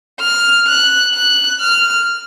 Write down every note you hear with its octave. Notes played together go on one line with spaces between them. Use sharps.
F6
F#6
F#6
F6